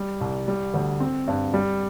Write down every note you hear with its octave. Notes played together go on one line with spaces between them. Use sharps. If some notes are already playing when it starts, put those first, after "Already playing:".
Already playing: G3
C2
G3
D2
C4
G2
G3